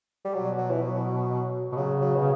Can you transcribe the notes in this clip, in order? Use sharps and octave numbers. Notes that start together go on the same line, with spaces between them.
G3
B2 F#3
F#3
E3
F#3
B2
C#3 F#3
F#3
B2